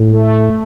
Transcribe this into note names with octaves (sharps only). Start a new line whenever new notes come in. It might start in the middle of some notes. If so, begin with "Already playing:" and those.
Already playing: A2
A3